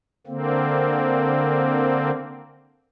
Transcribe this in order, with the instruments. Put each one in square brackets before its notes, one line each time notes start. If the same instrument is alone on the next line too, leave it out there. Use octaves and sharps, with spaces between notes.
[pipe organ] D3 A#3 C4